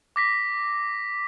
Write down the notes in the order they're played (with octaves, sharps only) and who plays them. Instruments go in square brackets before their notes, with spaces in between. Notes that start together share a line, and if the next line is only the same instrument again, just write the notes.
[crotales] D6 A#6 B6